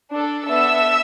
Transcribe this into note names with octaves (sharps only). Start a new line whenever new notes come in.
D4 A4
B3 D4 A4 E5 E6